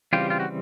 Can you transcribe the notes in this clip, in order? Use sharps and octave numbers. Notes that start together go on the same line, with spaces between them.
C#3 E3 G3 C4 F4 G4
F4
F#4